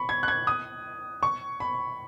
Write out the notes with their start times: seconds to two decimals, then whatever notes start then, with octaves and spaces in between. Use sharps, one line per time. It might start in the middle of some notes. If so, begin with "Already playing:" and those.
Already playing: B5 C#6
0.09 G#6
0.23 F#6
0.28 G#6
0.47 D#6
1.23 C#6
1.60 B5